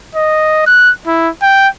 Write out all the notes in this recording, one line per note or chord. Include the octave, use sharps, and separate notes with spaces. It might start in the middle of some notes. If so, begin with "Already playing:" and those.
D#5
F#6
E4
G5